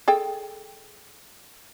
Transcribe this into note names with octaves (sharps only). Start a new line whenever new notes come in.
G#4 A4 G5